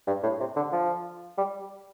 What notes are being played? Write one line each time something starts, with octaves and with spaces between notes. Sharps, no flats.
G2
A2
C3
D3
F3
G3